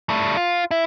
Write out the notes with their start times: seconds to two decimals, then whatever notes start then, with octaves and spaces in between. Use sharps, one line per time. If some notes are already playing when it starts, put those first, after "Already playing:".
0.10 G3 A3
0.37 F4
0.71 E4